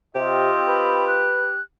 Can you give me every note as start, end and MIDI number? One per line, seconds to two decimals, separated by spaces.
0.15 0.52 48
0.15 1.27 60
0.15 1.27 65
0.15 1.59 67
0.15 1.27 75
0.68 1.49 71
0.68 1.05 83
1.08 1.61 90